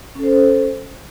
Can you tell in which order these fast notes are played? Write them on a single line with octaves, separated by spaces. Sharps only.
C#4 A4 C5